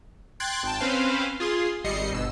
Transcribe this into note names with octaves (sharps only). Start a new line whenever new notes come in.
G5 C6 F#6 G#6 A6
G#1 G5 A5
C4 C#4 B4 C5 F5
F4 G#4 C6
G#1 G3 D#5 C7 C#7
G1 B2 E6